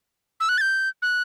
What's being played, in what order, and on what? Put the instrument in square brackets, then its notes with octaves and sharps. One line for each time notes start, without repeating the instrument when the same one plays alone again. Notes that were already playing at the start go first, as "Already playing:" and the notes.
[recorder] E6
F#6
A6
G6
F#6